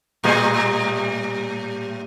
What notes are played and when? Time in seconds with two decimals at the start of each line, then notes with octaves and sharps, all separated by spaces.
0.24 A2 G3 G#4